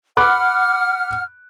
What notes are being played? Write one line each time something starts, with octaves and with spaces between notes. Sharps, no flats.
F#5 B5 D6 F6 F#6